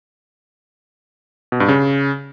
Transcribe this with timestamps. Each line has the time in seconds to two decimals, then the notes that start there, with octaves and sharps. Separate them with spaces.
1.52 B2
1.60 G2
1.68 C#3